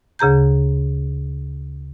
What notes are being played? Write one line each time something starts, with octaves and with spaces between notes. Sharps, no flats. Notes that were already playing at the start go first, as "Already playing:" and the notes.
D2 C#3 G#4 A#5 G6